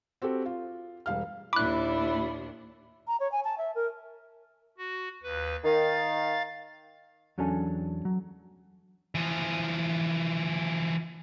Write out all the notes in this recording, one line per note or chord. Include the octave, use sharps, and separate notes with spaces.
C4 F#4 G4 A4
F4
E1 G3 F5 F6
D#2 A#2 D4 E4 B5 D6 F#6
A#5
C#5
G#5
A5
E5
A#4
F#4
D#2 B4
D#3 F5 A6
E2 F#3 C#4 D4 A4 G#5
F#3
E3 F3